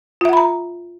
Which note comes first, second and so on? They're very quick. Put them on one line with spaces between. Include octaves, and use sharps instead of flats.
F4 E5 F#5 B5 A#5